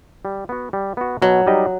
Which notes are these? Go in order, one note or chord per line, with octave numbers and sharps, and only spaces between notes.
G3
B3 F#4
G3
B3 F#4
B2 F#3
G3 D#4 G4 D#5